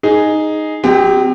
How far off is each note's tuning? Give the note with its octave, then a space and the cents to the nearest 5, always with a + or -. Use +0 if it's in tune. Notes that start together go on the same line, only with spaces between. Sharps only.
D#4 +0 G#4 +0
F#3 +0 C4 -30 G4 +35